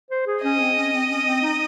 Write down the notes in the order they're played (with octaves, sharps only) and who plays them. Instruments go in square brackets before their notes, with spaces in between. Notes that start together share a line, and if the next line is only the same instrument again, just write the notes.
[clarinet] C5
G#4
[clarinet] C#4 [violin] D#5
[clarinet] C4
C#4
C4
C#4
C4
D#4